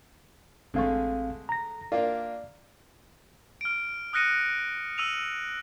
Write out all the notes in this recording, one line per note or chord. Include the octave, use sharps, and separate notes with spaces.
A1 D3 G#3 A3 C4 F5
A#5 A#6
A#3 D4 F4 D5
F6 D7
D#6 F6 F#6 A#6 C#7 D#7
E6 D#7 F7